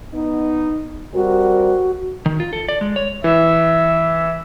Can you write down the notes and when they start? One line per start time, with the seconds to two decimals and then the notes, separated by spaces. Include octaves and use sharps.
0.14 B3 D#4
1.14 G3 C4 F#4 A#4
2.26 D#3
2.40 F4
2.53 A4
2.69 D5
2.81 G#3
2.96 C#5
3.24 E3 E5